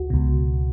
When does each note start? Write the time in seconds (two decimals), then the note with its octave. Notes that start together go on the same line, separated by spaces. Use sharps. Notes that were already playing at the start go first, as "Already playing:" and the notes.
Already playing: C#2 F#4
0.10 C#2 B2